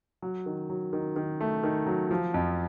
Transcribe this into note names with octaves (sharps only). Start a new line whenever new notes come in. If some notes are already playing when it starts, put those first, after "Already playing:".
F#3
D#3
F#3
D#3
D#3
A3
D#3
F#3
F3
F2